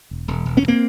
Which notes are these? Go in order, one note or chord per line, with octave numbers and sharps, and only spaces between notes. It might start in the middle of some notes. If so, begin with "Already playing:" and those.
E1
E1
E1
B3 C#4
D2
A#3 C4